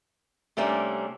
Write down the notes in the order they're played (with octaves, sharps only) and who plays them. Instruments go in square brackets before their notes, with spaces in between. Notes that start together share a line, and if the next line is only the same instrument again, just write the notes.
[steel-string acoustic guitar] C3 G3 A3 A#3 C#4 D4